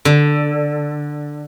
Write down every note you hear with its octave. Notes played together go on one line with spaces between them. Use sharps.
D3